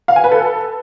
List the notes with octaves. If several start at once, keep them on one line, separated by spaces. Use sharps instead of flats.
F5
G#5
B4
A4